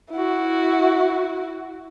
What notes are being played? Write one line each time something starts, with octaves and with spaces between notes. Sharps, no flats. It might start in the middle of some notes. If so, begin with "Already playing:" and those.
E4 F#4